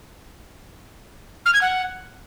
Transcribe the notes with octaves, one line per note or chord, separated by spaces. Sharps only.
F6
G#6
F#5